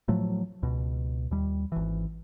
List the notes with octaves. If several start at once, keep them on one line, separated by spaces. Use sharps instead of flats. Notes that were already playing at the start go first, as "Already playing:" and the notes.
A2 F3 F#3 A3
C#2 B2
D#2 G3
G#1 E3